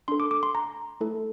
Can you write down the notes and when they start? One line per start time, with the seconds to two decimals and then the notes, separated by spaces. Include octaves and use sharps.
0.08 D4 A4 C6
0.20 D6
0.31 D6
0.43 C6
0.55 A#5
1.01 A3 E4 A4